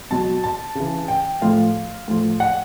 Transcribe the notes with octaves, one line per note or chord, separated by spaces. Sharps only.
B2 F#3 A5
A5
C#3 E3
G5
A2 F3 F5
A2 F3
F#5